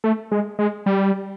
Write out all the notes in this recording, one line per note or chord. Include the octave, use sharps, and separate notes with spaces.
A3
G#3
G#3
G3